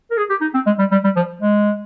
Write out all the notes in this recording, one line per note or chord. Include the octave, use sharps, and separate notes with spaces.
A#4
G#4
G4
D#4
C4
G#3
G3
G3
G3
F3
G#3